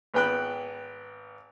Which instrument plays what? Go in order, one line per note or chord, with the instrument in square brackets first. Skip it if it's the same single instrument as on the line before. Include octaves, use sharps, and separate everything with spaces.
[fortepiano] G#1 B3 B4 G5 B5 F#6